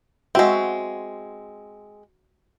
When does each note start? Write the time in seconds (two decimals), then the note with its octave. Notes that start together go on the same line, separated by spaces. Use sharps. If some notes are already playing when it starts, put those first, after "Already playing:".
0.35 G#3 C4 F#4 E5